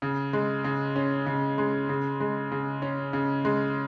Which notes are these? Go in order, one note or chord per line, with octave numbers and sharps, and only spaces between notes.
C#3
G#3
C#3
C#4
C#3
G#3
C#3
G#3
C#3
C#4
C#3
G#3